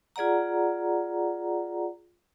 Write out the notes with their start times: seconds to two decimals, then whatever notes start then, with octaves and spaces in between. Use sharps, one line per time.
0.16 F4 G#4 D5 F#5 A#5